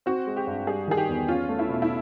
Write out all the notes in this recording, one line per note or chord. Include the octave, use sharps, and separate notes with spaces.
C4 F#4
G#3
G4
G2
G3 G#4
D#3 G#4
G4
E2
C#4 F4
A3
E4
B2
E4